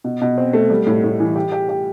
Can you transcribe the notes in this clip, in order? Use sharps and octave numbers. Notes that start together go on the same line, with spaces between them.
B2
B2
C4
A3
G3
A2
A2
E3
G4
G4
G4